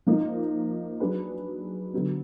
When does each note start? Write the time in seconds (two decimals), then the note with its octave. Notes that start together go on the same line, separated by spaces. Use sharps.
0.06 F3 A#3 D#4
1.00 F#3 D4 G#4 B4
1.93 D3 F#3 B3